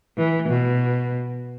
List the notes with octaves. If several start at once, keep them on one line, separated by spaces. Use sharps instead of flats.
E3
B2